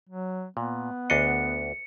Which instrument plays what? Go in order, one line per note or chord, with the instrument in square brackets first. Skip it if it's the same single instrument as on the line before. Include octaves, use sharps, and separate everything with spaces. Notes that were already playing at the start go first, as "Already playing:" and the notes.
[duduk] F#3
[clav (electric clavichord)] A#2 [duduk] B3
[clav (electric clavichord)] D2 D4 D#5 [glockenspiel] C#7